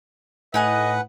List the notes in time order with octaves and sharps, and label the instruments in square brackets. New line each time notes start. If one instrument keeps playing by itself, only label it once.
[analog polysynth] A2 [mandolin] D#4 G#5 F#6 [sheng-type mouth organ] B4 F#5 [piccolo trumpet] D#5